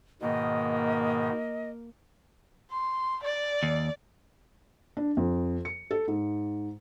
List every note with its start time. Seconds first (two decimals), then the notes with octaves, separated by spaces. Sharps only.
0.21 G#2 B2 D#3 A#3 D#5
2.71 C6
3.23 D5
3.63 D#2
4.97 D4
5.17 F2
5.65 C#7
5.91 A4
6.08 G#2